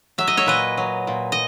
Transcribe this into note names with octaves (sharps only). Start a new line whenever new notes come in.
F#3 E5
D#5
C#5 E5
A#2 B4 D#5
F#3
A#2
D#5